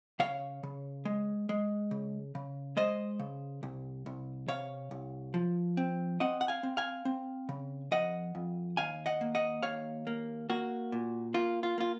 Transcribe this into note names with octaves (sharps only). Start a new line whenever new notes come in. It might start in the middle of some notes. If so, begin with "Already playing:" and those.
C#3 C#5 F5
C#3
G#3
G#3
C#3
C#3
G#3 C5 D#5
C#3
C2
C2
C3 C#5 F5
C2
F3
C4
C4 D#5 F#5
F#5
F5 G#5
C4
F5 G#5
C4
C#3
F2 D#5 F#5
F2
D#2 F5 G#5
D#5 F#5
A#3
D#5 F#5
D#2 C#5 F5
A#3
A#3 F#4
A#2
A#3 F4
F4
A#3 F4